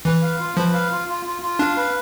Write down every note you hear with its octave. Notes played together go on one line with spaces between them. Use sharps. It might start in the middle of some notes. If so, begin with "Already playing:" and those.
E3 B4
F5
F4
F3 B4
F5
F4
F4
F4
F4
D4 F5
B4